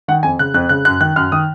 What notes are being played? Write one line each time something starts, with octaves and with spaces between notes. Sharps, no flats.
D#3 F#5
F2 G#5
C#3 F#6
F2 F#6
C#3 F#6
F#2 F#6
D#3 F#6
F#2 F6
D#3 D#6